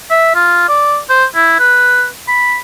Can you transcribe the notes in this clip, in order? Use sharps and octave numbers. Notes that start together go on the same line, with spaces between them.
E5
F4
D5
C5
E4
B4
B5